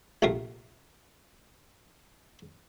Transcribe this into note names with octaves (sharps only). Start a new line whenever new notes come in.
A#1 C3 A3 A#4 F5